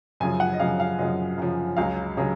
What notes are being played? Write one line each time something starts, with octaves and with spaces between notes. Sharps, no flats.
F#2 C#3 F3 G#5
F#5
D#5
F#2 C#3 F3 F5
F5
F#2 C#3 F3 D#5
F#2 C#3 F3
C#2 C#3 F#3 F5
C#3 F#3